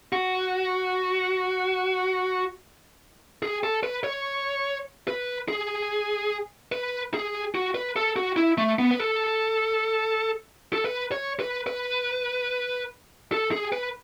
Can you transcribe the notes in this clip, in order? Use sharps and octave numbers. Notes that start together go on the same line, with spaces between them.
F#4
G#4
A4
B4
C#5
B4
G#4
B4
G#4
F#4
B4
A4
F#4
E4
A3
B3
B4
A4
A4
B4
C#5
B4
B4
A4
G#4
B4